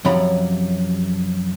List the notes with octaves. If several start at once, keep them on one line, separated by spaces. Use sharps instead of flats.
F#2 C3 F3 C#5 A#5 B5